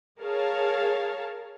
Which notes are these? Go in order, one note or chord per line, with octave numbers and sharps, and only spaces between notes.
G#4 A#4 C#5 F5 A5